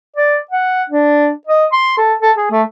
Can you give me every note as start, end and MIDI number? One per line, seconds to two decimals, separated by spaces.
0.17 0.38 74
0.51 0.84 78
0.90 1.30 62
1.47 1.66 75
1.72 1.94 84
1.98 2.14 69
2.22 2.32 69
2.38 2.48 68
2.52 2.63 57